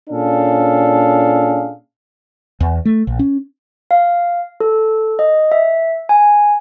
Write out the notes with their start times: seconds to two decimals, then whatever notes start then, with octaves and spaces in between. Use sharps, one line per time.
0.10 A#2 C#4 D4 G#4 A4 F5
2.60 E2
2.85 A3
3.07 A#1
3.19 C#4
3.91 F5
4.60 A4
5.19 D#5
5.52 E5
6.09 G#5